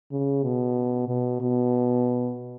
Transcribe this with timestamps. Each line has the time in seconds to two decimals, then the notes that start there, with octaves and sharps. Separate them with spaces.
0.12 C#3
0.44 B2
1.08 B2
1.41 B2